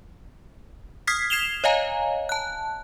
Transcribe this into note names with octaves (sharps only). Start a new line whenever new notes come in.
D#6 F6 G#6 B6 C7
G#6 C7 E7 F7 G7
C#5 D#5 F5 G#5 A#5
A5 F#6